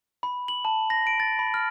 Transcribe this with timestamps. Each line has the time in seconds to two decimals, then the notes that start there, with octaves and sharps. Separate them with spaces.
0.23 B5
0.48 F#7
0.65 A5
0.90 A#6
1.07 D7
1.20 A6
1.39 B5
1.54 F6